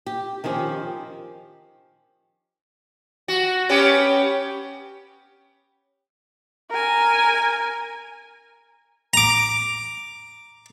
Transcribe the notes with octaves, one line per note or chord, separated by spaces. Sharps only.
G4
D#3 F3 C#4 G4
F#4
B3 C#4 G4
A#4 G#5
A#5 D6